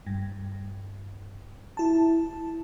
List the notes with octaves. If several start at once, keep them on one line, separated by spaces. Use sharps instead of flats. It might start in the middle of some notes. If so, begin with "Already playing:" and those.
G2
E4 A5